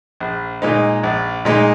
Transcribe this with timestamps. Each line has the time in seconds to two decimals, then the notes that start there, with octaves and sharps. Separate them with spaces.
0.20 A#1
0.62 A#2 G#3 D#4
1.03 A#1
1.45 A#2 G#3 D#4